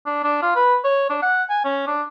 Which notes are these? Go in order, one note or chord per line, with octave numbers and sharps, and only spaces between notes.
D4
D4
F4
B4
C#5
D4
F#5
G#5
C#4
D4